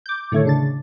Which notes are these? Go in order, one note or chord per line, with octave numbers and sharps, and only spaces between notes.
D6 G6
A2 D3 D#3 A3 A4 C#5
C#3 D4 A6